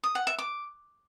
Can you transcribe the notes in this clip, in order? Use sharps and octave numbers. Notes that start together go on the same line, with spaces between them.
D#6
F#5
E5
D6